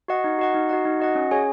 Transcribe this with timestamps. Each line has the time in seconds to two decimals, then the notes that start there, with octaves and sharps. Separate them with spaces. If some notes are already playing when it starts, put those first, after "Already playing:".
0.08 F#4 D#5 F#5
0.24 D#4
0.38 F#4 D#5 F#5
0.54 D#4
0.69 F#4 D#5 F#5
0.85 D#4
1.00 F#4 D#5 F#5
1.15 C#4
1.31 G#4 C#5 G#5